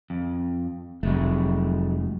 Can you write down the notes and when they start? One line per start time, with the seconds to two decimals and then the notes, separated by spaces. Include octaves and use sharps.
0.10 F2
1.03 F1 F#3 G#3 A3